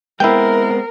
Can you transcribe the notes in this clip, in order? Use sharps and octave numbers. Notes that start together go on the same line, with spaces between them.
G#3 B3 C4 E4 A#4 G5